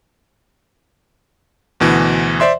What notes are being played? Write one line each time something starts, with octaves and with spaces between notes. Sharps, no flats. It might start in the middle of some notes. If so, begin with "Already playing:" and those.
D2 B2 E3
C5 D5 E5 C6